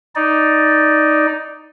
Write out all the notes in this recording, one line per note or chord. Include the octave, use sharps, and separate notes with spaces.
D#4 D5